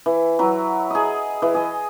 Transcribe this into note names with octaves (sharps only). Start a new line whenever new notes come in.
E3
F#3 E4
G#4 D#5
E3
G#4 D#5